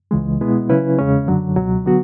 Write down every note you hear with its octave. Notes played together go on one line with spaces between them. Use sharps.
C#2 C#3 E3 G#3
B2 G#3 B3 E4
C#3 F#3 C#4 E4 B4
E2 C#3 G#3 C#4
F#2 D3 F#3
C#2 B2 F#3
D3 F#3 B3 F#4